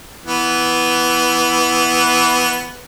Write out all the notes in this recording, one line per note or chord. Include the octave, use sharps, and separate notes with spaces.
E3 B3